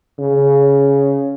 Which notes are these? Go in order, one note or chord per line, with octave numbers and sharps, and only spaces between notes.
C#3